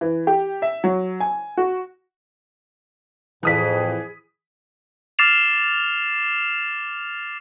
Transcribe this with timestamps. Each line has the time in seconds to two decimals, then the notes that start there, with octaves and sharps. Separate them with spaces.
0.01 E3
0.27 G4
0.62 E5
0.84 F#3
1.20 G#5
1.57 F#4
3.43 F2 A2 E3 G#4 D#6 B6
5.19 D6 F6 A6 C7 E7 F7